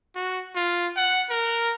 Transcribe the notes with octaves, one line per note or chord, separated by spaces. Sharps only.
F#4
F4
F#5
A#4